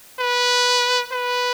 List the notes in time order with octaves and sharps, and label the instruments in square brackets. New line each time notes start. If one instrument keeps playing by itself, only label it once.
[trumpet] B4
B4